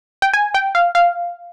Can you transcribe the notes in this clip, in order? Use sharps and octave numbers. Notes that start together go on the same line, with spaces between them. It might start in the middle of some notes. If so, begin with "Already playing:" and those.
G5
G#5
G5
F5
F5